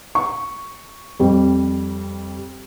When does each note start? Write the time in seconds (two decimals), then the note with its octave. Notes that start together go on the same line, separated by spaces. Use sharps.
0.15 C#6
1.20 F2 G3